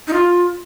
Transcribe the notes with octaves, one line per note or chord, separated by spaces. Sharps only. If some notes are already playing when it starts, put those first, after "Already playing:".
D#4
F4